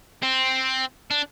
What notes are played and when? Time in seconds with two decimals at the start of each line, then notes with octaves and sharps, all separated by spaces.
0.22 C4
1.11 D4